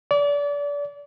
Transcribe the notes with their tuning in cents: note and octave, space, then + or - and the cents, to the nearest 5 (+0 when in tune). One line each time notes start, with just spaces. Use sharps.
D5 -30